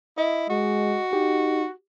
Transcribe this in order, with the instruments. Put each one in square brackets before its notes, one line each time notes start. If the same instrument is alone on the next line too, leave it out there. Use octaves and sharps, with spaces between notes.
[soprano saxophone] E4 [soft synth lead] D#5
[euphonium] G#3 [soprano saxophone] F#4
[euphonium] D#4 [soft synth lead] G4